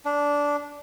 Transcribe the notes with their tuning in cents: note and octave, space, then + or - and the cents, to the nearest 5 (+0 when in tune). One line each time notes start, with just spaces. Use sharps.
D4 -15